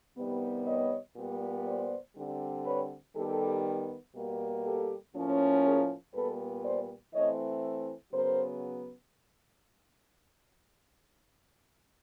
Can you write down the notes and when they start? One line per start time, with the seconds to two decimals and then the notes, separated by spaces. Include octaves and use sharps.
0.18 C3 D#3 G3 B3
0.67 C#5 D#5
1.17 A#2 G3 B3
1.67 C5 D5
2.16 D3 G3 C4
2.66 B4 C#5
3.16 D#3 G3 B3 G4 A4
4.15 B2 G3 A#3
4.65 G4 A4
5.15 A2 F3 A#3 C#4
5.64 G#4 A#4
6.14 A#2 G3 B3 A4 B4
6.64 C5 D5
7.14 E3 A3 C4 C#5 D#5
8.13 C#3 F#3 B3 A#4 C5